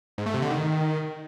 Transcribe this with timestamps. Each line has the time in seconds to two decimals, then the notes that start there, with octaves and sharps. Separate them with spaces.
0.18 G#2
0.26 A3
0.34 C3
0.42 D3
0.50 D#3